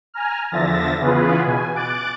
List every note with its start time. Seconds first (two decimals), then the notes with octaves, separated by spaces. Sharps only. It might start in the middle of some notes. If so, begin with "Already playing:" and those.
0.14 G#5 A#5 F6
0.52 E2 D3 F3 E5 A6 A#6
0.99 C#3 E3 B3 F4 G#4 B4
1.45 B2 G#5
1.75 D6 F#6 A6 D7